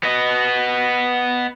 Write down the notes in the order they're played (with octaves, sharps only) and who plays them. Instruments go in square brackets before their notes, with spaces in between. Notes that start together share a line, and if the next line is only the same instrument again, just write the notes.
[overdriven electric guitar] B3 D#5